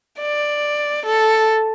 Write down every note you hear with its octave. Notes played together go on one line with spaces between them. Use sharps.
D5
A4